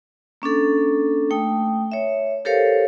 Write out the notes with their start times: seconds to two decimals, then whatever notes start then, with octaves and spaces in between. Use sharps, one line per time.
0.42 A#3 C#4 D4 A4
1.31 A3 G5 D#6
1.92 C#5 E5
2.45 G4 A4 A#4 C5 C#5 F5